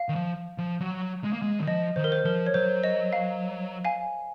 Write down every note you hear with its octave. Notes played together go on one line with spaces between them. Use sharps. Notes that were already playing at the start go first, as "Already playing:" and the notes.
Already playing: F5
D#3
F3
F3
F#3
G#3
A#3
G#3
D#3
F3 D#5
D#3 C5
A#4
C5
F3 A#4
C#5
F#3 C5
D#5
F5
F5 G#5